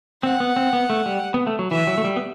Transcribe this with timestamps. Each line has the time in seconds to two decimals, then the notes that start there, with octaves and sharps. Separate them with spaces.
0.23 C4 F#5
0.40 B3
0.56 C4
0.73 B3
0.90 A3
1.06 G3
1.34 B3
1.47 A3
1.59 F#3
1.71 E3 E5
1.87 F#3
1.97 A3
2.04 G3
2.16 B3